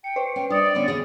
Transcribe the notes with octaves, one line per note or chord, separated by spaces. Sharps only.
G5 C#7
B4 C5
C#4 G5
G3 D4 D5 D#6 C#7
D3 B3 C#4
E2 C#4 G#4